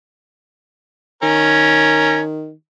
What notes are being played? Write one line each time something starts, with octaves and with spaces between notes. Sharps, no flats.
D#3 C#4 A#4